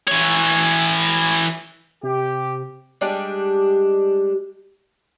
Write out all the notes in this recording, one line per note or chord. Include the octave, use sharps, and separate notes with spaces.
E3 C#5
C3 G4
G3 G#3 D4 G4